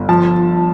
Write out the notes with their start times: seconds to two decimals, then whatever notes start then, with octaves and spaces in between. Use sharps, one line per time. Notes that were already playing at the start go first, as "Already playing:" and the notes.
Already playing: G1
0.09 F3 A5